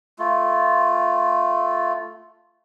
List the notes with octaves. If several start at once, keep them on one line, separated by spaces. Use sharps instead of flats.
A3 F4